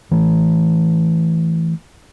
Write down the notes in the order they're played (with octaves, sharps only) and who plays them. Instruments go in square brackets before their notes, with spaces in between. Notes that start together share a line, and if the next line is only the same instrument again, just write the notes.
[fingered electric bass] E3 A3